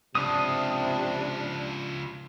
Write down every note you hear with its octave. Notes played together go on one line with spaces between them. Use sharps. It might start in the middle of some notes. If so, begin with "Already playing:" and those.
C#2 C3 F3 D4 D#6